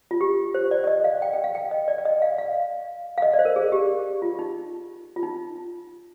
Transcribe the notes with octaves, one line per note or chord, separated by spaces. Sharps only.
F4
G4
C5
D5
D5
D#5
F5
G5
G5
F5
G5
D#5
D5
D5
D#5
F5
F5
F5
D#5
D5
C5
A#4
G#4
G4
F4
D#4
F4
D#4